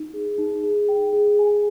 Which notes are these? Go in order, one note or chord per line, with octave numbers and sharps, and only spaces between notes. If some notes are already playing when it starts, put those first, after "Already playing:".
Already playing: D#4
G#4
D#4
G#4
G5
G#4
G#5